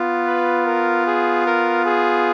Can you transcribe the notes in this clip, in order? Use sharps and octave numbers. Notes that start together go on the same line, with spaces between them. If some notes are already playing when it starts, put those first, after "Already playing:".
Already playing: B3 F4
B4
A#4
G#4
A#4
G#4